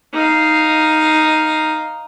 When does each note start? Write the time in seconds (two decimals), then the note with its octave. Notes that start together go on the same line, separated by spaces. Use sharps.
0.14 D#4 F5